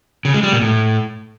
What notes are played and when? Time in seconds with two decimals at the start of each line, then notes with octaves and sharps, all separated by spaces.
0.25 C#3
0.34 G#3
0.43 G3
0.52 A#2
0.61 A2